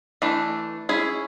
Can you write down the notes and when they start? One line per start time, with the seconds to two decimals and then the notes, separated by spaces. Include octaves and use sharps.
0.22 E3 A3 D4
0.89 C#4 E4 G#4